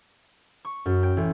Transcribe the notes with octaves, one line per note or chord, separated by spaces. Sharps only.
C#6
F#2
G5
A1